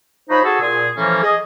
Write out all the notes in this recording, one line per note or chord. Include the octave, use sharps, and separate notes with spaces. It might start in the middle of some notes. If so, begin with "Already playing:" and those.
F3 D#4 C5 C#5 D#5 B5
F#4 G#4 A4
A#2 G#4
A2 E3 F3 G3 A#3 C#4
G#4 D#5